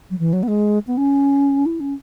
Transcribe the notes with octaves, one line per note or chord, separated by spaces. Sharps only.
F#3
E3
F#3
B3
G#3
B3
C#4
E4
C#4